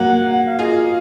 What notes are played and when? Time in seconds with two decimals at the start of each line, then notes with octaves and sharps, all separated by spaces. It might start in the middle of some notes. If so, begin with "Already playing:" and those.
Already playing: F#3 A#3 F#5
0.32 F#5
0.46 F5
0.59 F4 G#4 D#5
0.74 F5